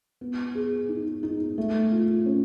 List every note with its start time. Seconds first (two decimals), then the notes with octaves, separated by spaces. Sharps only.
0.21 B3
0.55 G#4
0.89 D#4
1.23 D#4
1.58 A3
1.92 F4
2.26 C#4